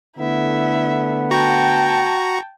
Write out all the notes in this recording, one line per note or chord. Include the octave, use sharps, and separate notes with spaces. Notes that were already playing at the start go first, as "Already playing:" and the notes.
D3 A3 B3 E4 E5
F#4 G5 A5 A#5 C#6